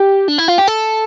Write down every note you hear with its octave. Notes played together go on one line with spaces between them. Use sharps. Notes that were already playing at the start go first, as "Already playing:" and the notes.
Already playing: G4
D4
E4
F4
G4
A4